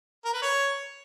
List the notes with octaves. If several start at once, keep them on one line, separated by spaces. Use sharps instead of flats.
A#4
B4
C#5